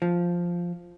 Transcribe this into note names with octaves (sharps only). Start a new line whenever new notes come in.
F3